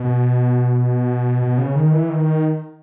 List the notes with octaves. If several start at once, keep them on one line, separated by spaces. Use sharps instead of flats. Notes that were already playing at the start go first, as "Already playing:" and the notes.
Already playing: B2
B2
C#3
D#3
E3
D#3